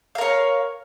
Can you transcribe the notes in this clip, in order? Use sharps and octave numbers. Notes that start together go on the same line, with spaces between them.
A#4 C#5 F5